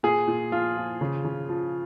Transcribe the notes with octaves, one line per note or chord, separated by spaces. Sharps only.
A#2 G#4
A#2
F3 F4
F3
C#3
C#3
F3